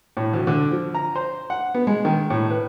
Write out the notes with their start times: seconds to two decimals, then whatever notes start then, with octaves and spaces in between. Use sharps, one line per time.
0.17 A2
0.33 D2
0.47 D3
0.72 F3
0.95 A#5
1.16 C5
1.50 F#5
1.75 B3
1.87 G#3
2.05 D#3
2.30 A2
2.50 B4